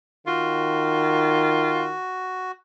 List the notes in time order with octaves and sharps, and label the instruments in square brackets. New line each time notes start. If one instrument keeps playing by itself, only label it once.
[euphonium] D#3 [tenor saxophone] F4 [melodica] F#4